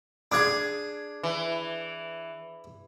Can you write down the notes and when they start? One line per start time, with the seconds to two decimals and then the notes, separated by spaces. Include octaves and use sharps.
0.32 D4 G#4 D6 G#6
1.23 E3